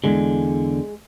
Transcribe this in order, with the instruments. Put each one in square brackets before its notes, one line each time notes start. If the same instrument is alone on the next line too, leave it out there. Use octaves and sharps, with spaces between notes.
[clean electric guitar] E2 D3 [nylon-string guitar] G#3